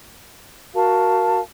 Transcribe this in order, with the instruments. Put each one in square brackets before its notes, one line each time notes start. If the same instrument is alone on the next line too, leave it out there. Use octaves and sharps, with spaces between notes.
[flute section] F#4 A#4 F5 A5